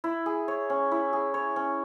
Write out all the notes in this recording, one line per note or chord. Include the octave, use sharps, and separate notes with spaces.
E4
G#4
C#5
C#4
E4
G#4
C#5
C#4